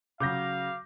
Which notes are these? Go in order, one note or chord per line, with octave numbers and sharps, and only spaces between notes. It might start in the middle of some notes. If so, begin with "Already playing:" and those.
C#3 F#3 F5 D6 G6 A#6